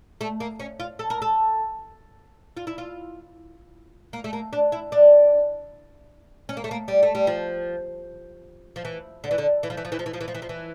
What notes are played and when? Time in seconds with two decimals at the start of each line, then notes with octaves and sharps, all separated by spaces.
0.21 A3
0.40 A#3
0.60 C#4
0.80 F4
0.99 A4
1.10 A#4
1.22 A4
2.57 F4
2.67 E4
2.78 F4
4.13 A#3
4.24 A3
4.33 A#3
4.53 D4
4.72 E4
4.92 D4
6.49 C#4
6.57 A#3
6.64 A3
6.71 A#3
6.88 G3
7.03 A3
7.15 G3
7.27 F3
8.76 F3
8.85 E3
9.24 D3
9.31 E3
9.38 D3
9.63 E3
9.70 F3
9.77 E3
9.85 F3
9.92 E3
9.99 F3
10.06 E3
10.13 F3
10.21 E3
10.28 F3
10.35 E3
10.42 F3
10.49 E3